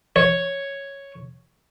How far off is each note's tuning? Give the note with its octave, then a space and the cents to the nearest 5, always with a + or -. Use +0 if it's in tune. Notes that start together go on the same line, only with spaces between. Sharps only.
C#5 +0